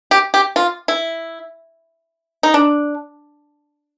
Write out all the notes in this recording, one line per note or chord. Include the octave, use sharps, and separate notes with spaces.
G4
G4
F4
E4
D#4
D4